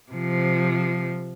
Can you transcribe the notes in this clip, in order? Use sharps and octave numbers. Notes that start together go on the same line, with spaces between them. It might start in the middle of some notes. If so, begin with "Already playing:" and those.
C3 F3